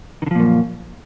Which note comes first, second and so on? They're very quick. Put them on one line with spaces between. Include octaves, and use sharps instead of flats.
D#3 D3 F3 A#2 F#2